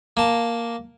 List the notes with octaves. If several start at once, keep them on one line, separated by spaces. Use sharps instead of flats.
A#3 A5